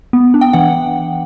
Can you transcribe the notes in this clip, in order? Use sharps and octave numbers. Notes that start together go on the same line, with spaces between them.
B3
D4
G5
E3 F#5